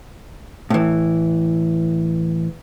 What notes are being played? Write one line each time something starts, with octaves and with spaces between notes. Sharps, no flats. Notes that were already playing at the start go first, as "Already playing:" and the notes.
A2 E3